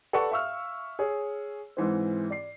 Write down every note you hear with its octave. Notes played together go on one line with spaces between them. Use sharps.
A4 B4 D5 F#5 A5 C#6
E5 F5 C#6 E6 F6
G#4 C#5
G#2 E3 C4
D5 C7